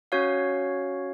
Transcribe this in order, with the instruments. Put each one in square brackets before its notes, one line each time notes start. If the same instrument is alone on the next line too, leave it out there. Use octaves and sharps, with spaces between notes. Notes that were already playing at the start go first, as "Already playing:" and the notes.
[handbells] C#4 F#4 C#5 F5